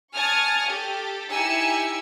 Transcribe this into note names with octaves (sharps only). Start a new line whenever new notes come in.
G#5 A5 C#6 D#6 F6 G#6
G4 A4
D#4 E4 G4 G#5 E6 C#7